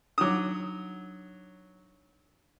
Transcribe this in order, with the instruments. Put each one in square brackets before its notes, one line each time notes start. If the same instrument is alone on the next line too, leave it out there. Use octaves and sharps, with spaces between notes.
[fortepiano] F#3 D#6 [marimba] D4 D#4 D6